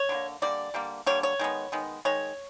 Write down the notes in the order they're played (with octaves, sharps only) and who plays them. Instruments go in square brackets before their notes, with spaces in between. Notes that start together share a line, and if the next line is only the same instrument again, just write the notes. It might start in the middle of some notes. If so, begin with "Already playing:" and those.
Already playing: [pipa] C#5
D3 G3 A#3
D3 G3 A#3 D5
D3 G3 A#3
D3 G3 A#3 C#5
C#5
D#3 G#3 B3
D#3 G#3 B3
D#3 G#3 C#5